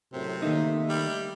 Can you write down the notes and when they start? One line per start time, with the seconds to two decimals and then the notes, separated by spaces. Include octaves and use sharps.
0.13 F#2 A2 C3
0.42 D#3 A3 A#3 D#4 E5
0.89 G3